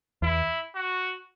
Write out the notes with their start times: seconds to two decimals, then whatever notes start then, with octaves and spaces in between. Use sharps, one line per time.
0.22 E2 E4
0.75 F#4